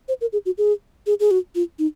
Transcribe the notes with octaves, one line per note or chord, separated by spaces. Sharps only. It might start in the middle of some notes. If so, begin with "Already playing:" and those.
C5
A#4
G#4
F#4
G#4
G#4
G#4
F#4
F4
D#4